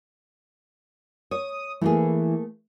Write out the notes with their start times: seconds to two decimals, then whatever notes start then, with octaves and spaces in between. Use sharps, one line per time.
1.31 C#5 D#6
1.81 E3 A3 A#3 G#4